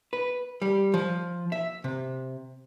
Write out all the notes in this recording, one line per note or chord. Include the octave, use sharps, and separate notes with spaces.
B4
G3
F3
E5
C3